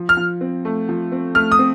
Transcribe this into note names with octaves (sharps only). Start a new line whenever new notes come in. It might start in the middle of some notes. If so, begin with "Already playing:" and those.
Already playing: F3
F6
F3
C4
A3
F3
C4
A3 F6
D#6
C4